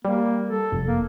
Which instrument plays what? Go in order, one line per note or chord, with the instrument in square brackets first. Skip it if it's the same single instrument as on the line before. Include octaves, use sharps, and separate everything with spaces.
[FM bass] G3 [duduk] A#3
[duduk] A4
[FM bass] F1
[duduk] A#3